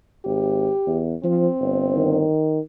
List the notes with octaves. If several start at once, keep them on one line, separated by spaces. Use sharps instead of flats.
G#1 G4
E2
F3 C4
G1
D#3